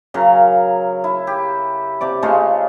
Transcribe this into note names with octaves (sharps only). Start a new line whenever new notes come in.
C#3 F#3 A#4 F5
E4
G4
C3 D5 D6
C#3 G#3 A3 F4